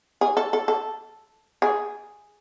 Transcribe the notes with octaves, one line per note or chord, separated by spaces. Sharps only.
G#4
A4
A4
A4
G#4